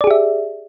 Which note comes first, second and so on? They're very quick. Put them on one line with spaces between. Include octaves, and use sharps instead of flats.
D5 G#4 G4 E5